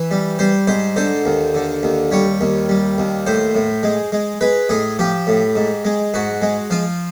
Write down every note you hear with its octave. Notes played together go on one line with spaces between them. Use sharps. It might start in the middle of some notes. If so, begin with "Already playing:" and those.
Already playing: E3
G3
G3 C5
G#2 C5
D3 C5
D#2
D3
D#2
G3 C#5
D#2
G3
D#2
A2 C5
A2
G#3
G#3
G#3 B4
A2 G#4
F3 G4
A2
G#2
G#3
G#2 F#4
G#3
F3 F4